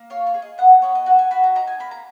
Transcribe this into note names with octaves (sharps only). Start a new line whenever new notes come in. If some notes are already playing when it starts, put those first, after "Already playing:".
Already playing: A#3
F4 C#5
C#5
G#4
D#5
B3 F#5
B3 C#5
D#5
F#4 F#5
G#5
F#4 B5
A#5
D#4 A#5
G#5
A#3 B5
A#5